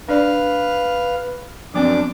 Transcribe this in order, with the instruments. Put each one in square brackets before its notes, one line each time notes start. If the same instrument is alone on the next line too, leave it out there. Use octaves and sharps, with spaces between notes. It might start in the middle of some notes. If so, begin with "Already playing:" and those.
[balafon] D4 D5 [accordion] B4 F5
[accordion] F#2 D4 D6 [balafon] F3 B3 C4